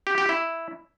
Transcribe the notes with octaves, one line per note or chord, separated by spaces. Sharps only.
G4
G4
E4